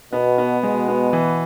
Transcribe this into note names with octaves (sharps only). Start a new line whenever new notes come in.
B2 B3
B3
B2 G#3
B3
E3